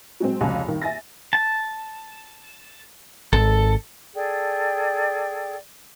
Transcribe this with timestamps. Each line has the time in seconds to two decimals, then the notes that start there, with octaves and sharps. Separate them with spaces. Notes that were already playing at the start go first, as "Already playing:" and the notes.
0.20 F#3 G#3 C4
0.41 F1 C#2 F#4 G#5 A5
0.67 G2 D#3
0.82 E5 G#5 A6 A#6
1.33 A5
3.33 G#1 A4
4.14 G#4 A4 D5 G5